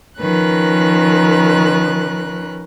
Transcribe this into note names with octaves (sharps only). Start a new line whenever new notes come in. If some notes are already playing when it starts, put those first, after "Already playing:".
D#3 F3 C#4 A#4 B4 F#6